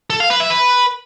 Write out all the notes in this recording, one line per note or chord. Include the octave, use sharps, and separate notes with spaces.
A4
F5
B4
E5
B4